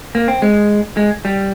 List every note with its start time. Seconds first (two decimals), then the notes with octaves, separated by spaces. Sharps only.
0.15 A#3
0.28 C4
0.42 G#3
0.97 G#3
1.25 G3